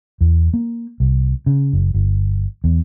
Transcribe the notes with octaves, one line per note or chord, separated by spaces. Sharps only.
E2
A#3
C2
C#3
F#1
G1
E2